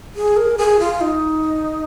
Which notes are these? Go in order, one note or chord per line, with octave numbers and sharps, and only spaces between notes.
G#4
A#4
G#4
F4
D#4